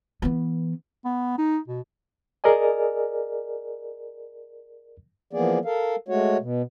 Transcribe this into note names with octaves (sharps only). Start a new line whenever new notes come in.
E3 B3
B3
D#4
B2
G#4 A#4 D5 D#5 G#5
E3 F3 A#3 B3 G#4 D5
A4 A#4 F5
G#3 A3 F#4 C#5
B2